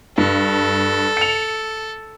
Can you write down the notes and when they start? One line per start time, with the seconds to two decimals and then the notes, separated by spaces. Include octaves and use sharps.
0.18 G2 A4
1.17 C#7 F7